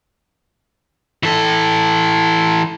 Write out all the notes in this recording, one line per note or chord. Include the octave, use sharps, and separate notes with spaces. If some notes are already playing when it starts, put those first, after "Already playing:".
E3 A4